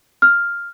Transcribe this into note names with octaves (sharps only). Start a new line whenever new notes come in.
F6